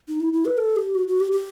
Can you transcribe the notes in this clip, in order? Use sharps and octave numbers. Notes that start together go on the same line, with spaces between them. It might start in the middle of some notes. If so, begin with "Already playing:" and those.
D#4
E4
E4
B4
A4
G4
F#4
F#4
G4
G4